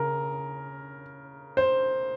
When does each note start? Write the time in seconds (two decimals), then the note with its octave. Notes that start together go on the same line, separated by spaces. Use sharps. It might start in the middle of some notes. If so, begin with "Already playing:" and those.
Already playing: C#3 A#4
1.57 C5